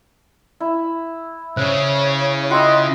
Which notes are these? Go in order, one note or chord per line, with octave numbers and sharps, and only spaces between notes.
E4
C#3 C5 C#5
F4 D#5 E5 F#5 G5 C6